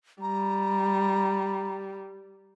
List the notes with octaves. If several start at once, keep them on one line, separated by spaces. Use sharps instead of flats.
G3 A#5